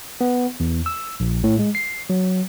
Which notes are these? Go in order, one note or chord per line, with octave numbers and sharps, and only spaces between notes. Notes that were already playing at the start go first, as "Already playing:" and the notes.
B3
E2
E6
A#1
A2
G#3
C7
F#3